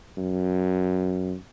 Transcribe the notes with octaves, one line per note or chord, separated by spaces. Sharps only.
F#2